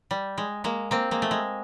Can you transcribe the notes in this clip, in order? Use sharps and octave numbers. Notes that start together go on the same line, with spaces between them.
G3
G#3
G#3 A#3
A#3 C4
G#3 A#3
A3
G#3